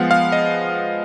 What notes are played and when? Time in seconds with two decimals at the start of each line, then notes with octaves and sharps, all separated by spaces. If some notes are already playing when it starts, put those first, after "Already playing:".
Already playing: F3 G#3 B3 F5 F#5
0.11 F5
0.32 D#5